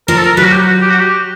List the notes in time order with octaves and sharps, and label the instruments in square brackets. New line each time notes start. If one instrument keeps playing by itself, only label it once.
[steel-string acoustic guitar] F3 [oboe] A#4
[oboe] A4
A#4
[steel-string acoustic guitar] F#3 [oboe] B4
[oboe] F#4
G4
F#4
G4
F#4
G4